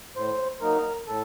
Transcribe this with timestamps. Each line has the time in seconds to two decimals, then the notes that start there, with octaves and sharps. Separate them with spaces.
0.16 A2 C5
0.61 F#3 A#3 D#4 A#4
1.07 A2 A4